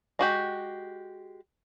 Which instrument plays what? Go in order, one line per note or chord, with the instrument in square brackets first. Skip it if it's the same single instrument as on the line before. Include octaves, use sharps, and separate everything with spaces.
[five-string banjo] G#3 F#4 G4